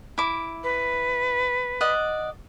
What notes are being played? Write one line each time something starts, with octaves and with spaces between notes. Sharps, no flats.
E4 D6
B4
D5 D#5 F#5